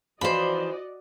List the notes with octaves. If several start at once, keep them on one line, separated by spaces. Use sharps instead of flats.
E3 F3 C#4 F#4 C5 D5 D#5 B5